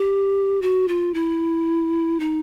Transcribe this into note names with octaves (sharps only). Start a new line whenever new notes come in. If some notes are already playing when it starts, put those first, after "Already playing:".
Already playing: G4
F#4
F4
E4
D#4